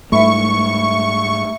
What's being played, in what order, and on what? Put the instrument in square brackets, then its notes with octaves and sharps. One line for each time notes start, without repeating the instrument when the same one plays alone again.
[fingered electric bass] G#2 G3 [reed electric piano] A3 [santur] E4 E5 E6 [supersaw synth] C#6